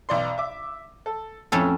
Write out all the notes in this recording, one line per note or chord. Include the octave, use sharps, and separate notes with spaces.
B1 D5 C6
E5 D6
A4
F2 A2 C#4 A4